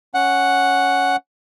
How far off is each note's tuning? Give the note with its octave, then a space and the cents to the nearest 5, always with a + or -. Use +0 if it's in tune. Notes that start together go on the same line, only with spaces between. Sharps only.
C#4 +0 F#5 +0